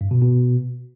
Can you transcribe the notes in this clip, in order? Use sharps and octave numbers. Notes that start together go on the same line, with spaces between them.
G2
B2
B2